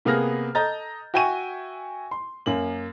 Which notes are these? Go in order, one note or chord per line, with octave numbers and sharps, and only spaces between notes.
C3 A#3 B3 G#4 F6 A#6
A4 D#5 A#5 G6 A6
F#4 E5 G5 G#5 C#6 D#7
C6
F#2 A#3 F#7